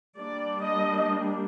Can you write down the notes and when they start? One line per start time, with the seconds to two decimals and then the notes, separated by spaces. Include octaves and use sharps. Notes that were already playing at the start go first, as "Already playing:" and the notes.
0.17 G3 A#3 D4 D5
0.61 D#5